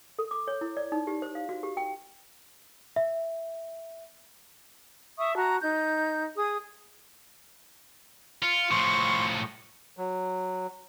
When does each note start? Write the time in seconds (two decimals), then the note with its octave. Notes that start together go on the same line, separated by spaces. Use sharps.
0.19 A4
0.31 D6
0.48 C#5
0.61 E4
0.77 D5
0.92 D#4
1.07 G4
1.22 C5
1.35 F5
1.49 F#4
1.63 G4
1.77 G5
2.96 E5
5.18 E5 C#6 D#6
5.36 F#4 A5 A#5
5.61 D#4 G6
6.36 G#4 D#6
8.43 F4 C#7
8.71 A2 F3 C6 C#6
9.97 F#3